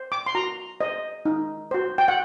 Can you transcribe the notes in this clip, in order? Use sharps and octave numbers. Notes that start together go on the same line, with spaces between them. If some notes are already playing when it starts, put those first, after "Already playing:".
Already playing: C5
D6
C6
F#4 A#5
C5 D#5
D#4
F#4 C5
G5
F#5